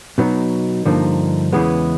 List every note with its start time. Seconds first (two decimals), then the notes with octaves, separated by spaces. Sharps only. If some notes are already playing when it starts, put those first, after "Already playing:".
0.18 B2 F#3 B3 D#4
0.85 G2 D3 F3 A#3 D#4
1.52 E2 C#3 E3 G#3 B3